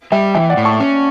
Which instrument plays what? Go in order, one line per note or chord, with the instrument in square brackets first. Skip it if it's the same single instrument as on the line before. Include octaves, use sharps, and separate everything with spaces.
[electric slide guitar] G3 [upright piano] E5 G5
[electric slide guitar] E3 [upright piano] E5 G5
[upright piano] D5 F#5
[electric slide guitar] A2
[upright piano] A5 C#6
[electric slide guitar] C#4